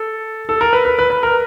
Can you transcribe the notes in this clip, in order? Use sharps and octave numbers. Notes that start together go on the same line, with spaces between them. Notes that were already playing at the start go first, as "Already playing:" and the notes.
Already playing: A4
A4
A#4
B4
B4
B4
B4
A#4